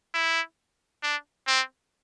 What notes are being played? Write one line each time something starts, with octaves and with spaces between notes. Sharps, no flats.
E4
D4
C4